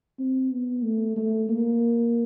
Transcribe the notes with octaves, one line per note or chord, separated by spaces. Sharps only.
C4
B3
A3
A3
A#3